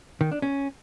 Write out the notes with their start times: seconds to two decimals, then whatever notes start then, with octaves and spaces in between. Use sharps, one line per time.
0.21 D#3
0.32 D4
0.42 C#4